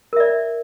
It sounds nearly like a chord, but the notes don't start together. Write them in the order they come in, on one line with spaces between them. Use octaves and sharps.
A#4 E5 D5